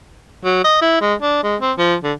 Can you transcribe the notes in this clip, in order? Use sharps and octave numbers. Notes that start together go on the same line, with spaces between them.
F#3
D#5
E4
G#3
D4
G#3
C4
F3
D3